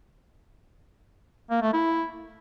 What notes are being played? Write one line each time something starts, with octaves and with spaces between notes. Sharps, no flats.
A#3
A3
E4